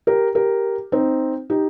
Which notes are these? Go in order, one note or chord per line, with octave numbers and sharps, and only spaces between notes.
G4 A#4
G4 A#4
C4 D#4
D#4 G4